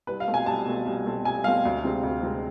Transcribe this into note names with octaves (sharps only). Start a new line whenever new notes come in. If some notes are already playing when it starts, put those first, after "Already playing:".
C2 B4
F5
B2 A3 C4
G#5
C2 A5
B2 A3 C4
C2
B2 A3 C4
C2 G#5
B2 A3 C4 F5
D2
C3 G#3 C4
D2
C3 G#3 C4